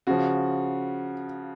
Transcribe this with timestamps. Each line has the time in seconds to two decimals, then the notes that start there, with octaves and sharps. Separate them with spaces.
0.07 C#3 F3 F#4